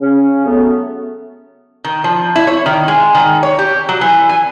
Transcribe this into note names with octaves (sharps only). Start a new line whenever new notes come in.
C#3 C#4
F#3 A3 B3
D#3
F3
E4
C#5
D#3
G#3
D#3
C#5
G4
F#3
E3
G#5